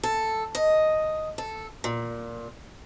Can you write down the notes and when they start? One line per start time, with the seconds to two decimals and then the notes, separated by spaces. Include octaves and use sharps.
0.04 A4
0.55 D#5
1.38 A4
1.84 A#2